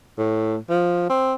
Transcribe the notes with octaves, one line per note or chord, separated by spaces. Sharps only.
A2
F3
C4